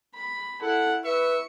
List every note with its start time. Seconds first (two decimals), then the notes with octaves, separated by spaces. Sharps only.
0.14 B5
0.62 E4 A4 F#5
1.05 B4 E5 C#6 C#7